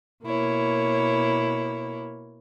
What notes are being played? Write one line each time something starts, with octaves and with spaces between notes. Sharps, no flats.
B2 A#3 E4 C#5